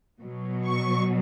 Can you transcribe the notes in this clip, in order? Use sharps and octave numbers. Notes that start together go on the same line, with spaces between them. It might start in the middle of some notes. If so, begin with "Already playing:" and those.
B2 F#3
C#6